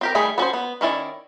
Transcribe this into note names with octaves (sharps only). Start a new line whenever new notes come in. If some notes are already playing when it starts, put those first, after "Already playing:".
C4 G4 A#4
D#3 G3 A3 G#4 B5
B3 C#4 F#4 A4 C5
B3
D#3 C#4 E4 D5